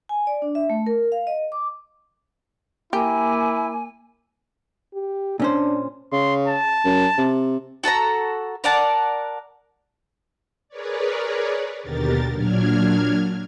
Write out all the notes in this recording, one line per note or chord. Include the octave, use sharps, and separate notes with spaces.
G#5
D5
D4
E5
A3
A#4
F5
D#5
D6
A#3 E4 G4 A#4 G#5 D6
G4
A#2 C#4 D4 C5
C#3 C6
A5
F#2
C3
F#4 A4 F#5 A#5
A#4 D5 F#5 A5
G#4 A#4 B4 C#5 D5
D#2 B2 D3 G4 A#4 A6
A#2 F#3 D4 F6 G#6